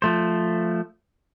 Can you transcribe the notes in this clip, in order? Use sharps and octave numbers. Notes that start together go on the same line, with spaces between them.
F3 A3 C5